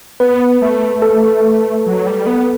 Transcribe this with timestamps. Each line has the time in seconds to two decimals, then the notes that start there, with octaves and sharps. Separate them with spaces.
0.20 B3 B4
0.62 A3
1.02 A4
1.86 F#3
2.06 G3
2.27 B3